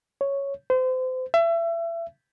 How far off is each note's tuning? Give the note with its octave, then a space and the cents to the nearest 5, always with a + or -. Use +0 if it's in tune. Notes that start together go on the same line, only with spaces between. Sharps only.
C#5 +0
C5 -30
E5 +30